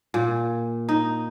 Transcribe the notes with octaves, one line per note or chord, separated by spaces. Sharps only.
A#2
D#4